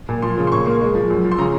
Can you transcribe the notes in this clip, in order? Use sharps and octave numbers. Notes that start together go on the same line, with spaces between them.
A#2
F3 C6
C#3
C6
A#2 C#6
A#3 C6
G#3
F3
F#2
F3
C6
C#3 A#5